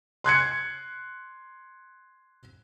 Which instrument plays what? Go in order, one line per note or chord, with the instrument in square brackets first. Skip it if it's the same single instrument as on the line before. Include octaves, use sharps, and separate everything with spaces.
[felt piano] C6 F#6 G#6 C#7